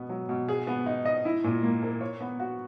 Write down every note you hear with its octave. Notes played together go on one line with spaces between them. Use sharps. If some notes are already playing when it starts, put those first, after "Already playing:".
Already playing: B2 B3
F#3
B2
G#4
B3
D#4
D#5
E4
A#2
A#3
A#4
C#5
B3
F#4